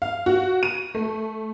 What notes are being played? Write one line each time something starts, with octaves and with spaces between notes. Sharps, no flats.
F5
F#4
D#7
A3